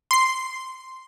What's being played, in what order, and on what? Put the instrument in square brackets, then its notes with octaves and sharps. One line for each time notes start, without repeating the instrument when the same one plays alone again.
[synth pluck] C6 C7